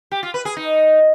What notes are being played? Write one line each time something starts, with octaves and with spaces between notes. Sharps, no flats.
G4
F4
B4
G#4
D#4